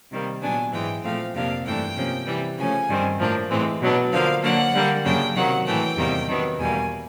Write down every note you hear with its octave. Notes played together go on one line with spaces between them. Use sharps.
C3 D#3 G3 A#3
A#2 F#3 B3 D4 G#5
G#2 E3 G#3 G5
A#2 F3 A3 C4 F5
F2 C3 F3 A#3 D4 F5
G2 E3 A3 D4 G5
C3 F3 A#3 C#4
C3 E3 G3
C#3 F3 A3 C#4 G#5
G2 D#3 G3 C4
A2 F3 A#3 D4
A2 E3 G#3 C4
B2 F#3 B3 D4
D3 F3 A#3 F5
D3 F#3 A#3 D4 F#5
D3 G3 A#3
F#2 C#3 F#3 A#3 D4 G5
C3 D#3 F#3 A#3 F#5
A2 E3 A3 G5
E2 C3 D#3 G3 A#3
C3 D#3 F#3 B3 D4
E2 B2 G3 A#3 G#5